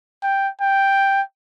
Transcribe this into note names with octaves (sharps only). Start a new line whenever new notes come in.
G5
G5